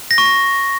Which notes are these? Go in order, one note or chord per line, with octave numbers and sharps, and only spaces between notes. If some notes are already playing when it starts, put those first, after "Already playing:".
A#6
C#6
A#6